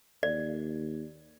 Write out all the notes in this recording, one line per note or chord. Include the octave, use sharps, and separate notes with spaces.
D#2 D5